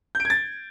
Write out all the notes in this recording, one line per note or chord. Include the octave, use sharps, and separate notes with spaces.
G6
D7
G#6
A6